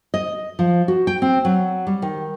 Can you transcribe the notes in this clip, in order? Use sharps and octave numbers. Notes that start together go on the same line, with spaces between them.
D#5
F3
F#4
G5
C4
F#3
G3
D#3